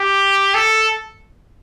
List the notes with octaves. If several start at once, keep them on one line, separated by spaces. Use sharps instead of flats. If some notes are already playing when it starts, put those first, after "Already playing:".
Already playing: G4
A4